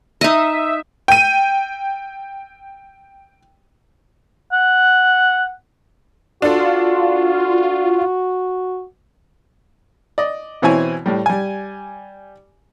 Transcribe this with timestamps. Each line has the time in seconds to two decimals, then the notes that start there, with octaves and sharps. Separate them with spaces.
0.21 D#4 D#5 E5
1.08 G5 D#7
4.52 F#5
6.42 D4 F4 F#4 A4
10.18 D5 D#5
10.62 B2 E3 C4 E4 C#5 G#5
11.06 A2 G3
11.26 G3 G#5